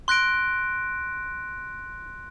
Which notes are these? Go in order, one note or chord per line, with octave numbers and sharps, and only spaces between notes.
C6 F#6 A#6 D7